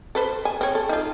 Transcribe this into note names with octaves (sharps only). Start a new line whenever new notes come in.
A4 B4 C5
G#5
C4 C#5
A4
D#4 F4